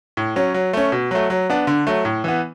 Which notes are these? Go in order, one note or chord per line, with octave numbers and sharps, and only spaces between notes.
A2
F#3 C#4
F#3
A3 C#4
B2
F#3 A3
F#3
B3 D4
D3
F#3 A3
A2
E3 B3